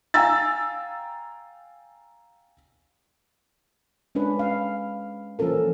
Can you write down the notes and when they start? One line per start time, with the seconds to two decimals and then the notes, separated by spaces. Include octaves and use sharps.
0.14 F5 G5 G#5 A#5 E6 A6
4.15 G#3 C#4 D4 B4
4.39 F5
5.39 E3 F3 A#3 C#4 A4 A#4